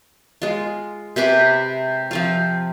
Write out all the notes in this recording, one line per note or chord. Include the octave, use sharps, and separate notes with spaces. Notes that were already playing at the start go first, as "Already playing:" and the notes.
G#3 F4
C3 B4 B5 D6
F3 C4 F4